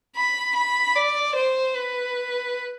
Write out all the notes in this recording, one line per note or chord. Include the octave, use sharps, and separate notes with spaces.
B5
B5
D5
C5
B4